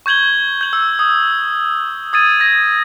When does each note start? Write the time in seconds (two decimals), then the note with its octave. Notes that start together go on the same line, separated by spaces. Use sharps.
0.06 C#6 G6 G#6 F#7 G7
0.61 G6 F#7
0.73 E6
0.99 D#6
2.13 D#6 G#6 A6 D#7
2.40 G#6 A#6